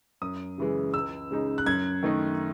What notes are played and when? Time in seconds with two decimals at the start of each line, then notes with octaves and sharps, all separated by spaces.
0.22 F#2 D#6
0.58 C#3 E3 G#3
0.94 C#2 E6
1.31 C#3 G#3 D#4
1.58 F#6
1.66 F#2 G#6
2.03 D#3 A3 D#4